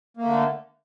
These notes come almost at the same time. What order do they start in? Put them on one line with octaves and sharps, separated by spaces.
A#3 A3 D3